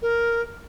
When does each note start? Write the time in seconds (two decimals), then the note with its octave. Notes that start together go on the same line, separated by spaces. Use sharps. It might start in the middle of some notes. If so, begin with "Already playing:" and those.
0.02 A#4